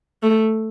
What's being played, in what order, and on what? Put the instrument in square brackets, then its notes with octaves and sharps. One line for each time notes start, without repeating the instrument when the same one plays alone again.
[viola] A3